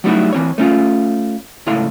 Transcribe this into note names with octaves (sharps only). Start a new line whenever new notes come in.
F#3 G3 A3 D#4 E4 F#4
E3 C4 C#5
A3 C#4 F4
C#2 A2 E4 A4 F5 C6